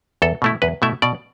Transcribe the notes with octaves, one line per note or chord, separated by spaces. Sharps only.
E2 A4
B2 A3 E4
E2 B4
B2 A3 E4 E5
B2 D5